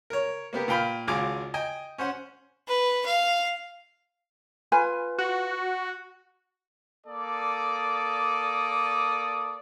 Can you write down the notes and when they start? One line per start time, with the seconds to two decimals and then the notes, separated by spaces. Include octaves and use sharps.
0.10 A#4 C#5
0.53 A#3 B3 G4 A#4
0.68 A#2 F5 G5 B5 F6
1.08 G#1 C#2 G#4 F5 G#5 D6
1.54 D#5 G5 G#5
1.98 C#4 C5 F#5
2.68 B4
3.06 F5
4.72 F4 B4 G#5
5.18 F#4
7.07 A#3 A4 D5 D6 D#6